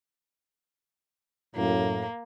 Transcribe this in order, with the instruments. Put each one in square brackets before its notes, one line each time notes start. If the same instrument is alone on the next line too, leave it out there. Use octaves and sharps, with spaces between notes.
[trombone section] F#2 A2 [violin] A#3